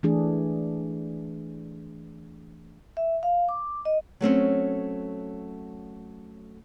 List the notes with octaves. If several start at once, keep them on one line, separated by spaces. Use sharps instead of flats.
E3 A3 D4 G#4
E5
F5
D6
D#5
F#3 A3 C4 C#4